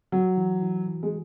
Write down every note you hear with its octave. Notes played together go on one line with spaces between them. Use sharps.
F#3 F#4
E3
E3
E3
G#3